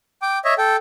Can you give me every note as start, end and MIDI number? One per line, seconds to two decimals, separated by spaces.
0.22 0.39 79
0.22 0.39 86
0.45 0.54 73
0.45 0.54 75
0.45 0.54 76
0.58 0.76 69
0.58 0.76 79